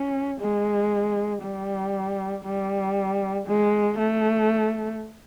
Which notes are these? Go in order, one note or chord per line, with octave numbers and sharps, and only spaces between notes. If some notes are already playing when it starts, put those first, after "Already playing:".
Already playing: C#4
G#3
G3
G3
G#3
A3